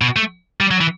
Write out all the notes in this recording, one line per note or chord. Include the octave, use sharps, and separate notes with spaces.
B2
A3
G3
F#3
E3